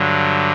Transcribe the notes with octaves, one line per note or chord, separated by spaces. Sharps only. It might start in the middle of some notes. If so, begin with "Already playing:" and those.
Already playing: G2 D3 F#3